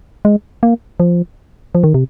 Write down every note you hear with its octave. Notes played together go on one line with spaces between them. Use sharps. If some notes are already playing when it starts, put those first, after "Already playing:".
G#3
A#3
F3
F3
D#3
C3